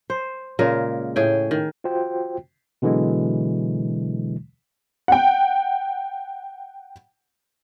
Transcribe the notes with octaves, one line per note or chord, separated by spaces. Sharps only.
C5
A#2 C#3 G#3 A#4
A2 G#4 G5
D#3
F4 F#4 C5 G5
B2 D3 E3 F#3 G#3
F#5 G5